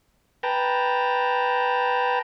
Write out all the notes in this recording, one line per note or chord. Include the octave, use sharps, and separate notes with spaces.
B4 G5 A5 A#5